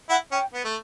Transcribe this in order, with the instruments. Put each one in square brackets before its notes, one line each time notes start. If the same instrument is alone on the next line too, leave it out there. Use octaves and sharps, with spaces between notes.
[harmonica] E4 [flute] F#5
[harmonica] C#4 [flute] G5
[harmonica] B3
A3